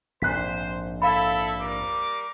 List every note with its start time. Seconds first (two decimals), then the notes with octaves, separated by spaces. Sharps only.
0.22 A#1 F2 G#2 C5 F#6 B6
1.02 E4 A4 E5 F5 B5
1.59 G3 A#4 D6